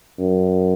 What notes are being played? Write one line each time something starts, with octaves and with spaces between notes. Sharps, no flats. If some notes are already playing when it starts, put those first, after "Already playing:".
F#2